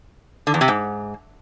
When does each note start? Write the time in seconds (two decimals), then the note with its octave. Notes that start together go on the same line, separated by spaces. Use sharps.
0.47 D3
0.54 E2
0.61 C3
0.68 G#2